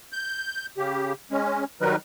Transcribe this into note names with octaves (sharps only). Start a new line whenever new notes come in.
G6
C#3 G4
G#3 C#4
D#3 F#3 G3 D#4 A#4 B4